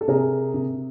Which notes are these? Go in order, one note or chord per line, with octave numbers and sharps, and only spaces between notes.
A4
C3 G#4 A#4
C3